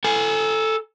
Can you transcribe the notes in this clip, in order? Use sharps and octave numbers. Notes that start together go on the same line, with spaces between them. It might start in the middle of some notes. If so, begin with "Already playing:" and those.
A4 G#5